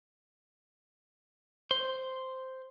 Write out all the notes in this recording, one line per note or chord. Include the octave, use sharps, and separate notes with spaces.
C5